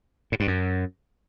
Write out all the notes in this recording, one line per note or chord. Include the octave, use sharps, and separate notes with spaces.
A2
G2
F#2